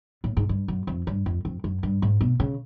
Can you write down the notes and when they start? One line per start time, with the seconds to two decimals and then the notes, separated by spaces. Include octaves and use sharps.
0.24 A2
0.37 G#2
0.49 G2
0.68 F#2
0.87 F2
1.07 G2
1.26 F2
1.45 F2
1.64 F#2
1.83 G2
2.02 G#2
2.21 B2
2.40 C#3